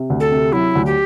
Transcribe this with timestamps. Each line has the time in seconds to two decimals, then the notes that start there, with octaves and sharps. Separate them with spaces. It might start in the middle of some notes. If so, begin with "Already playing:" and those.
Already playing: C3
0.10 D2
0.20 A4
0.32 C3
0.53 F#3 E4
0.75 D2
0.86 G4